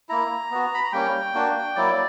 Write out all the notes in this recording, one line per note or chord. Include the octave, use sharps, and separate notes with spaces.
A#3 E4 A#5
B3 F#4
B5
A#5
G3 A#3 C#4 G5
A#3 D4 F#4
F#3 A#3 E4 D5